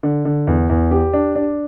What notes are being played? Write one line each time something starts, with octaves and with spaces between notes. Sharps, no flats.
D3
D3
E2
E2
G4
D4
D4